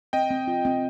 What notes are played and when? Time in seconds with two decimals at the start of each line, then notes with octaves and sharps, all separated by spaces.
0.13 C4 D#5 G5
0.30 C4
0.48 F4
0.65 C4